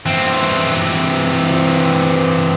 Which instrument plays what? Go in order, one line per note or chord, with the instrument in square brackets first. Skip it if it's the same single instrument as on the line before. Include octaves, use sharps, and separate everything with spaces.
[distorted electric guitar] E3 C4